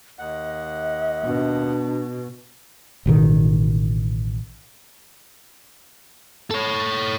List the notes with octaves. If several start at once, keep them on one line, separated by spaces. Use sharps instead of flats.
D#2 D#5 F#5
B2 D4
A1 B2 D#3
A4 C#5